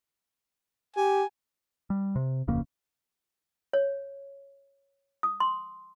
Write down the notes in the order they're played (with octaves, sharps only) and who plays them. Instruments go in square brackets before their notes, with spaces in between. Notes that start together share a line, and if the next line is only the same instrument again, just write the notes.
[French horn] G4 [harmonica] G#5
[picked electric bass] G3
C3
D1 F2 C#3 A#3
[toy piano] C#5
D#6
C6